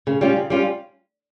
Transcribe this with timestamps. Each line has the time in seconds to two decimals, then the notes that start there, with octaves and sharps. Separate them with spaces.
0.07 C#3
0.21 G3 C#4 F4
0.36 C#3
0.50 G3 C#4 F4